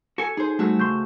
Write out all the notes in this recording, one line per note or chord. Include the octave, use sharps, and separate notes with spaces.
F#4 A4 G#5
D#4 G#4 C5
G3 A3 F#4 E6
C#2 C6 C#6 G6